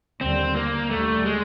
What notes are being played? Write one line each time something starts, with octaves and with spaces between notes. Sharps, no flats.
D#2 D3 G3 C4
A#3
D#2 D3 G3 A3
G#3